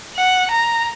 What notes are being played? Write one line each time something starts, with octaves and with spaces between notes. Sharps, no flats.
F#5
A#5